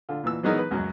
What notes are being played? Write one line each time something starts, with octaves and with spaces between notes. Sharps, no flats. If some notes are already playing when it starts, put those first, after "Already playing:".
D3 F4
A#2 E3 E6
E3 F#3 G#3 B3 D#4 A#4
B4
C#2 F#2 F#3